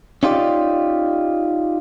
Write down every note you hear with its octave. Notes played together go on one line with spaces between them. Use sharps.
C#4 D#4 F4 G4 D5